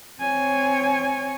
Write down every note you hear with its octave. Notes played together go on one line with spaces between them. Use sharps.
C4 C#5 G#5